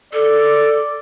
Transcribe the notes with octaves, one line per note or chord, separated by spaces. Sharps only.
A4 D5